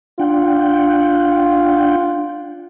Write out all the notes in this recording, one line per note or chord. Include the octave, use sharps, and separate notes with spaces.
D4 F4 F#5 G5